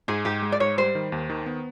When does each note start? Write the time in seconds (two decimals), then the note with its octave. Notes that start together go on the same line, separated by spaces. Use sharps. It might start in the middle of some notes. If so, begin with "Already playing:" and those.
0.08 G#2 G#4
0.25 G#2 G4
0.42 G#3
0.52 D5
0.60 G#2 C#5
0.78 G3 C5
0.95 D#3
1.12 D#2
1.30 D#3
1.46 B3